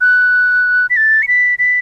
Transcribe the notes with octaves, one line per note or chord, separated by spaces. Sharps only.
F#6
B6
A6
C#7
B6
B6